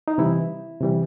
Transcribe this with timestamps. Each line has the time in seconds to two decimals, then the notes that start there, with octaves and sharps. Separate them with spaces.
0.08 D#4
0.18 C3 E3 G3 E4
0.81 C3 E3 G3